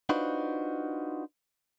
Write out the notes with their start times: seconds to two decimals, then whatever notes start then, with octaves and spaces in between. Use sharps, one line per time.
0.09 D4 D#4 F4 F#4 B4 C5